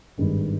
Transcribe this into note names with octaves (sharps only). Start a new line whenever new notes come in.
G#1 G2 D#3 G#3